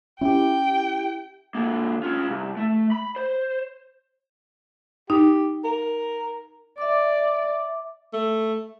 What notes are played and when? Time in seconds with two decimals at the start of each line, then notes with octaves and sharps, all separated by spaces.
0.21 C#4 E4 G4 G5
1.55 D3 A#3
2.03 C#4 F4
2.29 C2
2.57 A3
2.92 B5
3.16 C5
5.10 D#4 G4
5.64 A#4
6.78 D5 E5 D6
8.13 A3